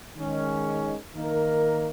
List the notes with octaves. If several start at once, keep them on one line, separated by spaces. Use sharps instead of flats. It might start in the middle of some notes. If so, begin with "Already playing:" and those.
D#3 G#3 C#4
D#3 A#3 D#4 A#4